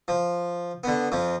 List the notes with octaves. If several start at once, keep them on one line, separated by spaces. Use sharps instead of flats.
F3
D3 B3
F2 F3